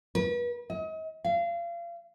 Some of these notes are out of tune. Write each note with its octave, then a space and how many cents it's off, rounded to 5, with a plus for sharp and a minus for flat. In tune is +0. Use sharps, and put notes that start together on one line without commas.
B4 -35
D#5 +40
F5 -30